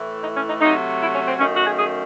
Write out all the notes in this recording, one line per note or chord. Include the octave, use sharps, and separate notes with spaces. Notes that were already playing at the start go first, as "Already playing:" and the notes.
Already playing: A2 E3 A3
D#4
C#4
D#4
C3 F#3 A3 D#4
E4
C#4
C4
F#2 D#3 A3 C#4
F#4
G#4
G#4